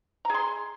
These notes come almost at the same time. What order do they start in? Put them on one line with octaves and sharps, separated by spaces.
A#5 G#4 C6